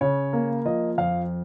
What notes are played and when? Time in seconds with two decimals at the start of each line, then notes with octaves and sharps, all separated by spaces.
0.01 C#3 C#5
0.33 A#3
0.65 F3 D#5
0.98 F2 F5